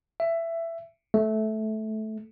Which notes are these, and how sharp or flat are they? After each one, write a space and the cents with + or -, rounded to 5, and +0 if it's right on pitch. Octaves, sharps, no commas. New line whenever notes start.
E5 +15
A3 -15